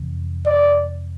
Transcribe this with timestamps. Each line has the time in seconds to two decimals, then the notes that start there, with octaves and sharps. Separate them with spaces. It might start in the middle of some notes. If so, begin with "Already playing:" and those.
Already playing: F2 C3 E3
0.46 D5